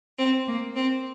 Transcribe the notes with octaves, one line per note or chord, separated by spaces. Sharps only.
C4
A#3
C4